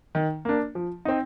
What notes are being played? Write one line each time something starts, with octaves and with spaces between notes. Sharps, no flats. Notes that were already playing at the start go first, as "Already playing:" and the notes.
D#3
A#3 D4
F3
C4 D#4